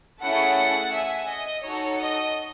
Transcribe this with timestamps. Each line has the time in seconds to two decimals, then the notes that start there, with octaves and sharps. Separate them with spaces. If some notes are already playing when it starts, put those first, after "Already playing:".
0.22 A3 C#4 E4 G#4 F#5 A5
0.94 E5 G#5
1.29 D#5
1.64 D#4 F#4 A4 C#5
2.00 D#5